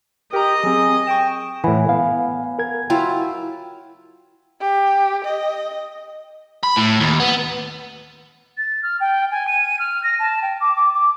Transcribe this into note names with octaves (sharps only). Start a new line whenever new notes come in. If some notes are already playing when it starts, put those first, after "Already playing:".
G4 A#4 D#5 A#5
F#3 C4 G#4
G5 C#6 D7 E7
A2 E3 F#5 G#5 B5
B3 F5
A#4 G#6
F#3 E4 F4 G5
G4
D#5
B5
A2
D#2
B3
A6
F6
G5
G#5
D#7
F6
A#6
A5
G5
D6
D6
D6